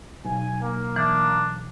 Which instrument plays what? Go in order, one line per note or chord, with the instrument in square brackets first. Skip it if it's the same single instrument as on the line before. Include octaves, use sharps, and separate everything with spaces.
[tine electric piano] B1 [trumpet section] G#5
[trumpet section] A#3
[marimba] E3 [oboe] D4